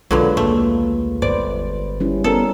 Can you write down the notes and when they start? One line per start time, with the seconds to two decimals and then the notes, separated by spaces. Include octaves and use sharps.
0.11 B1 A#2 D3 F#3 G#3 F4 B4
0.37 D#2 A3
1.22 G1 B4 C5 D5
2.00 G3 C#4 E4
2.24 B3 C#4 A4 A#4